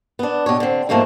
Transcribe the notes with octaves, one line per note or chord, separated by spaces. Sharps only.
B3 D4
B2 G4 C#5
D3 C4
G#2 B2 F3 A3 A#3